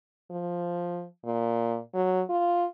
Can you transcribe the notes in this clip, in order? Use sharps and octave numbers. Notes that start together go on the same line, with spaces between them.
F3
A#2
F#3
F4